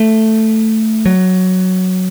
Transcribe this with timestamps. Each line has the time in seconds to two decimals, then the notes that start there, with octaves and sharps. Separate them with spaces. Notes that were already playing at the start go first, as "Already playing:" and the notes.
Already playing: A3
1.06 F#3